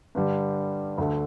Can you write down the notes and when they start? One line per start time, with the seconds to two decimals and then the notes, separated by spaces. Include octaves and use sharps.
0.15 G2 D3 G3
0.98 D2 D3 A3